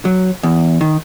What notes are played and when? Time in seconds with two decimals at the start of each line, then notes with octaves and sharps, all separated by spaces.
0.05 F#3
0.43 E2
0.81 D#3